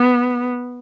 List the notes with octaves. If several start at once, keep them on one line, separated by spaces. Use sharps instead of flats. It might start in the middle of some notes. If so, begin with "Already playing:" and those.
Already playing: B3